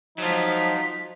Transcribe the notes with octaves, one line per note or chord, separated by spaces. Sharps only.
F3 F#3 D#4 F4 B6